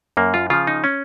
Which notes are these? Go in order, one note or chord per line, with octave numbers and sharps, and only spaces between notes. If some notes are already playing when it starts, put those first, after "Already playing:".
F#2 A#3
F4
C#3 F3 F4
D#4
C#4